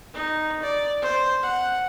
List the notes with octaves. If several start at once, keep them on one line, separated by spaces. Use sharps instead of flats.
D#4
D5
C5
F#5